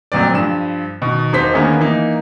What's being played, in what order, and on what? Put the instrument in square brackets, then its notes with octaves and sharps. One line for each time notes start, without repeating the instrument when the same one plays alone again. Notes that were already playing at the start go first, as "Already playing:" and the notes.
[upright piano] F2 A#2 F#3 C4 D5
G2 F3 E7
B2 D#3
E1 D#4 C5 B6
D3 D#3 A#3 B3 C#4 G#4
E3 A#3 D#4